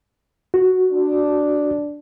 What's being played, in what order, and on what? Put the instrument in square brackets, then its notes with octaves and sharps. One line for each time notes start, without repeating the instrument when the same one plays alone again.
[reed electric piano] F#4
[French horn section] D4